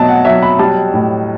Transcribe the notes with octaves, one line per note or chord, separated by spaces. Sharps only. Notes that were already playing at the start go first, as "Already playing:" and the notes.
Already playing: B2 F#3 A5
F#5
F#3 E5
B5
G3 A5
A2